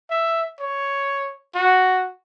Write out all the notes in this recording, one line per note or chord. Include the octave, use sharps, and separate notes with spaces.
E5
C#5
F#4